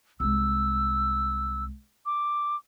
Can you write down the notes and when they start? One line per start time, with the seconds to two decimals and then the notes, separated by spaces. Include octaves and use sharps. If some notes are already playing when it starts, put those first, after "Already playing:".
0.20 C2 G#3 E6
2.06 D6